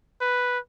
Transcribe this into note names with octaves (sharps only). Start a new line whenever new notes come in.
B4